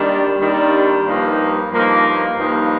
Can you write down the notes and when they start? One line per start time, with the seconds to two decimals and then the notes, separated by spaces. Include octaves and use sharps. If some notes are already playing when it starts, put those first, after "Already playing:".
Already playing: D#2 D#3 G3 D4
0.40 D#2 D#3 G3 D4
1.06 G2 F3 A#3 D#4
1.71 G2 F3 A#3 D#4
2.37 G2 F3 A#3 D#4